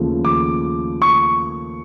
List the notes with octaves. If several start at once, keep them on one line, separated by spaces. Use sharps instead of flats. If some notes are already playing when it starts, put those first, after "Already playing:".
Already playing: D#2 C#3 F3 A3
D6
C#6